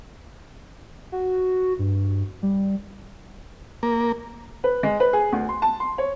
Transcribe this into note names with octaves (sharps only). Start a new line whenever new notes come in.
F#4
G2
G3
A#3
B4
G#3
B4
G#4
D2
C6
A5
C6
C#5